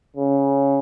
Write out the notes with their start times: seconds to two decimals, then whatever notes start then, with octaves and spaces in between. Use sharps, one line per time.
0.17 C#3